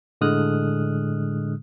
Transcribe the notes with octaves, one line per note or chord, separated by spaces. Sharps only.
A2 D3 G#3 D#6 F6 F#6